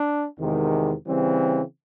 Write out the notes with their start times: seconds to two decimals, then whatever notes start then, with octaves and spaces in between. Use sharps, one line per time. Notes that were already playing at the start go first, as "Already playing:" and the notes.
Already playing: D4
0.38 E2 C3 D#3 G#3
1.06 C#3 E3 G3 C4